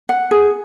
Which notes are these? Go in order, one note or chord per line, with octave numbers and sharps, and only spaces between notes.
F#5
G#4